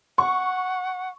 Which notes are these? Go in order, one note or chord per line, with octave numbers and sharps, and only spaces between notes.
F#5 C#6